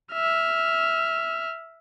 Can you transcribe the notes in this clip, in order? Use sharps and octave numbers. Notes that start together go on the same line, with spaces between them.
E5 F6